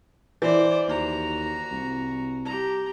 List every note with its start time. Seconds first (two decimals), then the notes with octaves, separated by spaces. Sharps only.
0.42 E3 C5 D5
0.88 D#2 F#4 A#5
1.71 C2
2.45 G4 A#5